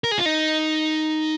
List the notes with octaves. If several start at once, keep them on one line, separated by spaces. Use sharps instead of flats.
A#4
G#4
F4
D#4